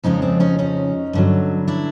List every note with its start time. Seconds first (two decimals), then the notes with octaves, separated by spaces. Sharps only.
0.04 F2 C#3 F3 G#3 C#4 D#4
0.22 C4 D4
0.40 C#4 D#4
0.59 C#4 D#4
1.13 G2 D3 F#3
1.68 D4 E4